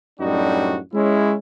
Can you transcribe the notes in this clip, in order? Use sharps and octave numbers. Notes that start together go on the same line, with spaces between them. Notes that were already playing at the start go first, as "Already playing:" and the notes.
F#2 A2 G3 D4 D#4 F#4
G#3 C#4 E4